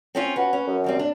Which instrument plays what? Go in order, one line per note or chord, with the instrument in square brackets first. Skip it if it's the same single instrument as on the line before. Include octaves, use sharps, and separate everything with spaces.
[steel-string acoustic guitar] C4 C#4 F4
[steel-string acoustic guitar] C#4 F#4 [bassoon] B4
[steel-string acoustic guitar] C#4
[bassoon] F#2
[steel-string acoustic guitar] D#2 G3 C4
D4